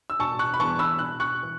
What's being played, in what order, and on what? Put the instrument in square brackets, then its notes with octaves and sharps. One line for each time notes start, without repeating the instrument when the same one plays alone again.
[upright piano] E6
E1 A5 C#6
C#6 F#6
B5
E2 E3 A5 C#6
B5 E6
E1 F#6
C#6 F#6
E3